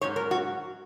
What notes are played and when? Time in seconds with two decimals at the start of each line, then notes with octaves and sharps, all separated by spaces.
0.01 G#2 F#3 C#4 C#5
0.16 A#4
0.31 F#4